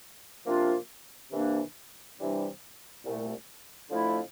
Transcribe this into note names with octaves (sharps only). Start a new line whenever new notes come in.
C3 F3 A#3 D4 F4
C2 C3 E3 A#3 D4
C3 E3 G3 D4
C2 A#2 A3
F2 D3 F3 A3 E4